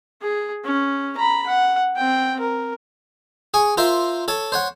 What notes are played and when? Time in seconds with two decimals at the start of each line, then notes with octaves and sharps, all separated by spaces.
0.22 G#4
0.64 C#4
1.18 A#5 B5
1.47 F#5
1.96 C4 G5
2.40 A#4
3.54 G#4 G#5 C#6
3.77 F4 A#4 C5 E5
4.28 A4 C#5 A5
4.52 C5 C#5 F#5